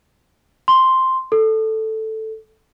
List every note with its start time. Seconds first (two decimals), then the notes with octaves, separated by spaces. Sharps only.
0.68 C6
1.32 A4